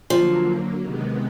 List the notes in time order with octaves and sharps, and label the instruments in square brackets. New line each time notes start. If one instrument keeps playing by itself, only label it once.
[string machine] D3 F#3 A#3 [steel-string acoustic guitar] F3
[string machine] C3 D#3 G#3 B3